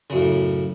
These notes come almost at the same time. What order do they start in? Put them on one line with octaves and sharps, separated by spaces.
C#3 F#2 A2